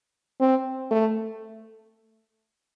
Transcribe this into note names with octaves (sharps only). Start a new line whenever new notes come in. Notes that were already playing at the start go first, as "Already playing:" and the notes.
C4
A3